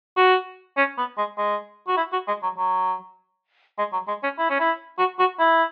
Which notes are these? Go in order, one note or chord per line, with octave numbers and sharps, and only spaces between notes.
F#4
C#4
B3
G#3
G#3
F#4
E4
F#4
G#3
F#3
F#3
G#3
F#3
G#3
C#4
E4
C#4
E4
F#4
F#4
E4